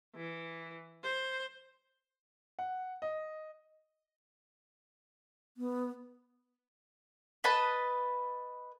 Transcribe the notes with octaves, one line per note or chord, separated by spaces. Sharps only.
E3
C5
F#5
D#5
B3
B4 D#5 A5 B5